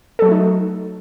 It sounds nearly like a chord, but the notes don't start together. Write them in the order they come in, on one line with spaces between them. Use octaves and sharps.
A4 F#3 F#4 A3 D#4